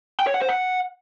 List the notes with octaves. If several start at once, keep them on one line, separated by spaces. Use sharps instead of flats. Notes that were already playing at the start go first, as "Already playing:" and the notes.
G5
C#5
F#5
C5
F#5